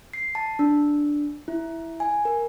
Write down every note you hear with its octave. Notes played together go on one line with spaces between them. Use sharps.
C7
A5
D4
E4
G#5
A#4